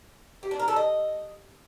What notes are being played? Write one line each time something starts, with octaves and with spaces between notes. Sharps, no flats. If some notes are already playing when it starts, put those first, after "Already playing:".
G4
D4
A#4
A4
D#5